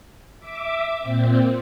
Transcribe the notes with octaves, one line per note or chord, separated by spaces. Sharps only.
E5 D6
A#2 C4